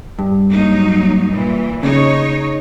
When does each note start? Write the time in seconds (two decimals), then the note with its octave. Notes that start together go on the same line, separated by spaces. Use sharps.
0.19 G2
0.51 F#3 A#3 D#4
1.32 A#2 E3
1.83 C#3 D#4 C#5